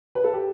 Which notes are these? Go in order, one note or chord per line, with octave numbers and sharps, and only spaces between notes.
B4
A4
G4